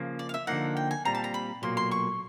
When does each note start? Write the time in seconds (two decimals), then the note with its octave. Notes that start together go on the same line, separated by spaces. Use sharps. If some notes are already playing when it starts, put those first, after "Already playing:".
Already playing: C#3 F3 A#3
0.19 D5
0.29 F5
0.34 E5
0.47 D3 F3 A#3 D#4 F#5
0.77 G5
0.91 G#5
1.05 A#2 G3 C4 A#5
1.15 A5
1.24 A#5
1.34 B5
1.62 B1 A#2 F#3 A#3 C6
1.77 C6
1.91 C#6